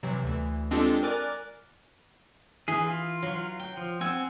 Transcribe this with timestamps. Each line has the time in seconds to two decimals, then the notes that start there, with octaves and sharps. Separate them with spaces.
0.03 C3 E3 F#3
0.23 D2 E3
0.71 G#3 C4 D4 F4 G4 A4
1.03 A#4 D5 G#5 D6 F#6 A6
2.68 E3 G#4
2.87 F4
3.22 F#3
3.59 G5
3.77 F3
4.01 C4 F#5 G#5 E6